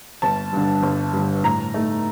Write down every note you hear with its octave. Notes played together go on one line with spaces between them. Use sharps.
G1 A5
G2 D3
G1
G2 D3
A2 A#5
A3 D#4